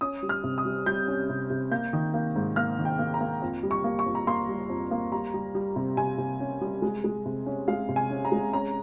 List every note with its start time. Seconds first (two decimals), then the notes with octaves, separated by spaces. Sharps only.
0.01 C#4 D#6
0.23 G3
0.29 F6
0.44 C3
0.58 D#6
0.65 G3
0.86 G3 G6
1.08 C#4
1.29 C3
1.50 C3
1.72 A#3 G6
1.93 D#3
2.14 A#3
2.36 G#2
2.56 A#3 F6
2.78 D#3
2.85 G5
2.99 A#3
3.14 A#5
3.21 A#3
3.42 F2
3.63 G3
3.71 C#6
3.84 A#3
3.99 C#6
4.06 F2
4.15 A#5
4.27 A#3 C6
4.49 G3
4.70 F2
4.91 A#3
5.12 G3 A#5
5.34 G3
5.55 G3
5.76 C3
5.97 C3 G#5
6.18 C3
6.40 C#4
6.61 G3
6.82 G#3
7.04 G#3
7.26 C3
7.46 C#4
7.68 G#3 F5
7.89 C3
7.96 G#5
8.10 C#4
8.25 A#5
8.32 G#3
8.53 C#4 A#5